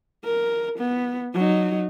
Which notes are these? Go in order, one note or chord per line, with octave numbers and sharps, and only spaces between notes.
A#4
B3
F#3 D#4